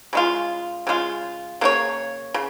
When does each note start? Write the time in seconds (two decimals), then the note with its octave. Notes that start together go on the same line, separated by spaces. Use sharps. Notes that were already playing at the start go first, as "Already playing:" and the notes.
0.13 C#3 G#3 F4
0.87 C#3 G#3 F4
1.61 C#3 A#3 D#4 C#5
2.34 C#3